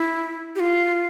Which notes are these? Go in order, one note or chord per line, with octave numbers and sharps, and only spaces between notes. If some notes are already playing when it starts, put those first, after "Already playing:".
Already playing: E4
G4
F4